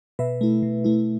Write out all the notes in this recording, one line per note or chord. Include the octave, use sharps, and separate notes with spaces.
B2 B4 E5
A3 E4
B2
A3 E4